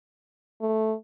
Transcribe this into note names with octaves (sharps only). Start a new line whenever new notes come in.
A3